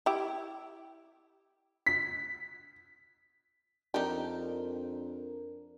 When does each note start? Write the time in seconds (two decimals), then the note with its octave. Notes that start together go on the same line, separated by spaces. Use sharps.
0.06 E4 G4
1.86 B6
3.94 F2 D4 D#4 G4 A#4